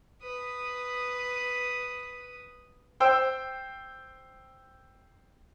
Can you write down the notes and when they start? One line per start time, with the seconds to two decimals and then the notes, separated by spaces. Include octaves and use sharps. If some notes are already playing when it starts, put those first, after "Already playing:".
0.23 B4 D#6
3.00 C5 G5 E6